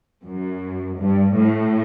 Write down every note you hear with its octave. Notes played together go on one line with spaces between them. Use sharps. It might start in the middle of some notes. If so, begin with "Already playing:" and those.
F#2
G2
A2